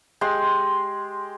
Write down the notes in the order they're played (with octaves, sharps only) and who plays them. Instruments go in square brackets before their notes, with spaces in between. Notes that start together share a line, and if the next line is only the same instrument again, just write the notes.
[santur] G#3 G4 C6